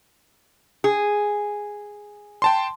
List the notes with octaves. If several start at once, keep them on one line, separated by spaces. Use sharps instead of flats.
G#4
G5 A5 C6